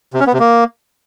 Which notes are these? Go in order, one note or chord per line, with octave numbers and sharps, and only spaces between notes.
C3
C#4
B3
C3
A#3